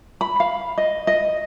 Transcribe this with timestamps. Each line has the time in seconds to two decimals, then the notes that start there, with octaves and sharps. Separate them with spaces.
0.21 B5
0.40 F5
0.78 D#5
1.07 D#5